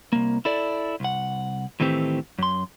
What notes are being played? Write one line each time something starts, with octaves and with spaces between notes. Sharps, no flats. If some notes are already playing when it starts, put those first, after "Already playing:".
C2 A#3
E4 A4 D5
C2 F#5
A2 D#3 E3 A3 C4 G4
F#2 C6